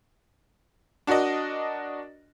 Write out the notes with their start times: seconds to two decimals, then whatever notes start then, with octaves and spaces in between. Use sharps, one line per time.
1.07 D4 F#4 A#4 D5 D#5